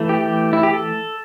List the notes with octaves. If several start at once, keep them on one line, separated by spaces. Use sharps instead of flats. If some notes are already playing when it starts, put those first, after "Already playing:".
Already playing: E3 A3
G4
G4
E4
G4
A4